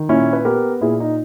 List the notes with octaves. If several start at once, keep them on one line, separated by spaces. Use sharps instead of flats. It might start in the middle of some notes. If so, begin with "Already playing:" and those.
Already playing: D#3
A#2 C#4 E4
B4
B3 G4 A#4
A#2 E4 G#4
D#4